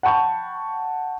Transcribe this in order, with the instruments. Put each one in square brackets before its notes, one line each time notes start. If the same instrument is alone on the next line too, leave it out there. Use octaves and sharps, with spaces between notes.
[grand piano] F#5 G5 A5 B5 C#6 G6